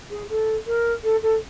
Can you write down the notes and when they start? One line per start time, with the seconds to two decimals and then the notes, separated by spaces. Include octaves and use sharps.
0.10 G#4
0.30 A4
0.67 A#4
1.03 A4
1.22 A4